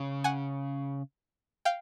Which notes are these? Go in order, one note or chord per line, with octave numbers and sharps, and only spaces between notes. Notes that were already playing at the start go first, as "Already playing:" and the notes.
Already playing: C#3
F#5 G#5
F5 G5